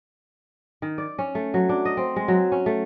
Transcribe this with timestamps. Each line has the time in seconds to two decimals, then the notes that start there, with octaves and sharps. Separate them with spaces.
0.82 D#3
0.98 D5
1.18 C#4
1.35 A3
1.54 F#3
1.69 D4
1.85 D#5
1.97 C4
2.16 G#3
2.28 F#3
2.52 C#4
2.66 A3